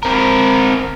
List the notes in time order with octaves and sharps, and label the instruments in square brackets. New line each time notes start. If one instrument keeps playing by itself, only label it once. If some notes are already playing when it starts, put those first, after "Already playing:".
[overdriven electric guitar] C4 A#4